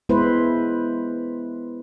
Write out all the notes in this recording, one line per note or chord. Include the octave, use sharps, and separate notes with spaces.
G#3 B3 E4 B4 C5